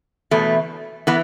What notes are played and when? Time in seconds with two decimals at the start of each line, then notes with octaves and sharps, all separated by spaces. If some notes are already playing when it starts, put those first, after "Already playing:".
0.31 E2 B2 A3
1.07 E3 B3